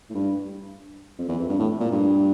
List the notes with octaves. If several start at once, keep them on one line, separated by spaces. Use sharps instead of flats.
A2
G2
F2
E2
F2
G2
A2
A#2
G2